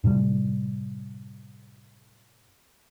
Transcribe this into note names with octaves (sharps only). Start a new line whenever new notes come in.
F#2 A2 C3 G3